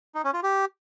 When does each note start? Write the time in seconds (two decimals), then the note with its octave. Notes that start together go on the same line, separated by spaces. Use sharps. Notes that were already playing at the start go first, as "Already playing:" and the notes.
0.15 D#4
0.24 C#4
0.34 F4
0.43 G4